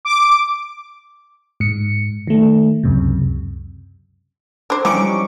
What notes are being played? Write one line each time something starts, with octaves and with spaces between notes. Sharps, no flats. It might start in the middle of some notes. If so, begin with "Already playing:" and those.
D6
G#2 C#7
D#3 A3
C#2 F#2 C3
D4 C5
E3 F3 G3 C#4 D#4 C#6 D6 D7